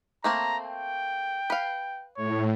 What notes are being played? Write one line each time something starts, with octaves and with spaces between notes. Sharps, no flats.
A3 A#3 C4 A#5
G5
B4 F5
A2 C#5